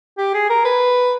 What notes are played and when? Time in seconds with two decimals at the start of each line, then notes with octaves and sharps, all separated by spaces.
0.18 G4
0.34 G#4
0.50 A#4
0.65 B4